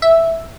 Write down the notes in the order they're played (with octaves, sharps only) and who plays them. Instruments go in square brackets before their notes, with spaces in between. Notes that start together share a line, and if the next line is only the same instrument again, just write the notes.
[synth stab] E5